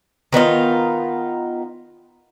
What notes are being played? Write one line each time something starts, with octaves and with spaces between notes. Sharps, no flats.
D#3 B3 D#4 F4